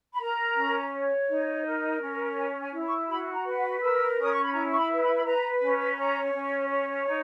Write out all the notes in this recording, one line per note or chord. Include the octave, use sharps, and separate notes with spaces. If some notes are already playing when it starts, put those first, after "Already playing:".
B5
A#4 A#5
C#4
C#5
D#4
A#4
C#4
C#5 G#5
G#5
E4
C#6
F#4 B5
A#5
B4
F#5
A#4 E6
C#4 D#6
C#6
B5
E4 A#5
C#6
B5
B4
B5
B5
B4 A#5
C#4
C#5 A#5
C#4
C#5
D#4